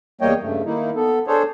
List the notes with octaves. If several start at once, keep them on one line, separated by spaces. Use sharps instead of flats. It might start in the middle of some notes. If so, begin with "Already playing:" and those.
E2 G3 A#3 C#5 D#5 G5
G2 C#3 A3
D#3 A#3 D#4 E4
B3 A4
D4 G#4 A4 C5 C#5